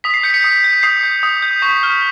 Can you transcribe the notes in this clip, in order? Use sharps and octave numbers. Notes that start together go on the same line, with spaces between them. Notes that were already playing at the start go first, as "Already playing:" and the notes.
D#6 B6
C7
G6 B6 C#7
B6 C#7
D#6
G6
D#6 C7
G6
D#6
G6
C#6 B6
F6